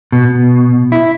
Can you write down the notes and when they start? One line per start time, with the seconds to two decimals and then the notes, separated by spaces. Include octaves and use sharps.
0.12 B2
0.92 E4